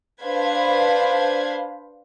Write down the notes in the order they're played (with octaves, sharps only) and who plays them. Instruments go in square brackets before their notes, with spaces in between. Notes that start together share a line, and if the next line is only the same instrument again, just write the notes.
[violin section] D4 B4 C5 F5 B5 G#6